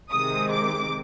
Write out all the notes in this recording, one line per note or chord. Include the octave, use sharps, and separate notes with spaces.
C3 D#3 G#3 C4 D#6
D6